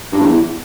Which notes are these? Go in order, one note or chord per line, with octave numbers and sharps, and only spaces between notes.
G2
E2